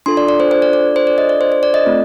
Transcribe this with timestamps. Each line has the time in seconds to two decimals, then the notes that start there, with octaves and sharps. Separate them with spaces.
0.06 D4 F4 A4 C6
0.17 D5
0.29 D5
0.40 C5
0.51 C5
0.62 D5
0.73 D5
0.96 C5
1.07 D5
1.18 D#5
1.29 D5
1.41 C5
1.52 C5
1.63 D5
1.74 D#5
1.85 A3 C4 F4 A4